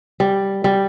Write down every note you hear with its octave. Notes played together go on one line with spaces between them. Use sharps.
G3
G3